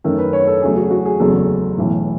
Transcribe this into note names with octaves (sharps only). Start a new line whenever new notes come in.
F#2 D#3 A3 A4
B4
C#5
A4
E2 C#3 F#3 A3 G#4
F#4
F#4
G#4
F#1 E2 C#3 F#3 A3 A4
B1 A2 E3